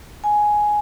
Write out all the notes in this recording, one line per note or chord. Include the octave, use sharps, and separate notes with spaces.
G#5